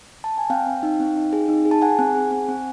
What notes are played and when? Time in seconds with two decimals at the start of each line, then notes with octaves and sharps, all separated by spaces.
0.24 A5
0.38 G#5
0.50 C4 F5 G5
0.66 C4
0.83 D#4
1.00 C4
1.17 D#4
1.33 G#4
1.48 D#4
1.65 G#4
1.71 A5
1.82 G#4 F#5 G#5
1.99 C4
2.15 G#4
2.31 C4
2.48 C4